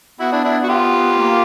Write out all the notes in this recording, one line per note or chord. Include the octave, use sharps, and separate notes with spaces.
B3 E4 F#4
D4 E4
D4 E4
F#4
F4 G4
A#3